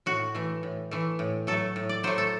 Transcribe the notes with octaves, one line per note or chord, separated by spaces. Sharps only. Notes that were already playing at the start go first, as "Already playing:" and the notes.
A2 F#4
E3 A3
A2
E3 A3
A2
F#3 A3 A4
A2
D5
F#3 A3 C5
A4